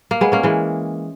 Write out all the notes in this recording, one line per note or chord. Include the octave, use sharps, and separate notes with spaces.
A#3
G#3 B3
A#3 C#4
E3 G#3